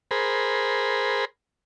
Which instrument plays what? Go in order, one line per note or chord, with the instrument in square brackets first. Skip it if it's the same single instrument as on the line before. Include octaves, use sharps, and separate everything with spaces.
[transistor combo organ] G#4 A#4 C5 B5